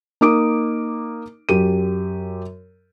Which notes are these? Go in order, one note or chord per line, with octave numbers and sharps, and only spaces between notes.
A#3 D#4 D6 D#6 D7
F#2 G4 D#7